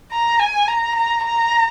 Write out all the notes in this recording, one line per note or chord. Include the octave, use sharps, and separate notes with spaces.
A#5
G#5
A#5
A#5
A#5